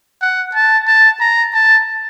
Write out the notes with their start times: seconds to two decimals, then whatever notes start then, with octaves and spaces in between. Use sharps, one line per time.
0.22 F#5
0.55 A5
0.88 A5
1.21 A#5
1.54 A5